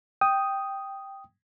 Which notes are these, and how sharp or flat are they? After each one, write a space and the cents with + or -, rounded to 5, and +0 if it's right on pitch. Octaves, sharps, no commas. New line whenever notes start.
G5 +0 D#6 +0